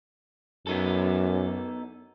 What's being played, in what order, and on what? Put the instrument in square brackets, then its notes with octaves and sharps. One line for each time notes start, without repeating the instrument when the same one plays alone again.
[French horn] F#2 [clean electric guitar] B3 D#4 A4